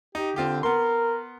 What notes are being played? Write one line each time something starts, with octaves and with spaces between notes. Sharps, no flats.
D#4 G4
D3 C4 F4 G4
B3 A#4 C6